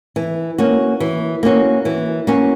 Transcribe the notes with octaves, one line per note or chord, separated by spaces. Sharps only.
E3
A#3 C#4 F#4
E3
A#3 C#4 F#4
E3
A#3 C#4 F#4